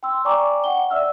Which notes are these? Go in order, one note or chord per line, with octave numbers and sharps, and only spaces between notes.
G5 C6 E6
D5 G5 G#5 A#5 C#6 D6
F#5 G5 G7
D5 E5 E6 F6